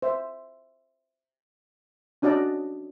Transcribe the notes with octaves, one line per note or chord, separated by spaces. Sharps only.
C5 E5
C#4 D4 F#4 D5 D#5 A5